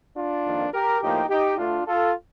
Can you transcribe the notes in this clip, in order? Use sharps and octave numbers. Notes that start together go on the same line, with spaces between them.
D4 F4
F2 D#3 A#3
G4 A#4
A2 F3 A#3 D#4 G4
D#4 G4
D2 D3 A3 D4 F4
F4 A4